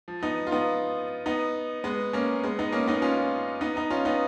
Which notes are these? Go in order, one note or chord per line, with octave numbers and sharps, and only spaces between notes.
F3
B3 D#4
F4
B3 D#4
B3 D#4
G#3 B3
A#3 C#4
G#3 B3
B3 D#4
A#3 C#4
B3 D#4
C#4 F4
B3 D#4
B3 D#4
C#4 F4
B3 D#4